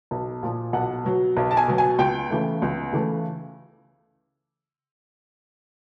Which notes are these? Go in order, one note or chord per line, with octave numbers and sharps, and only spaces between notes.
B1
A#2 F3
B1 F#5
B2 F#3
B1
A5
G#5
B2 F#3
G#5
C#2 G5
C#3 E3 A3
C#2
C#3 E3 A3